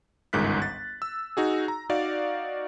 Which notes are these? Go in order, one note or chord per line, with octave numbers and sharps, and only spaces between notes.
G1 C#2 G#2 D#3 F#6 B6
A6
E6
D#4 F#4 G#4
A#5
D#4 F#4 D5 F5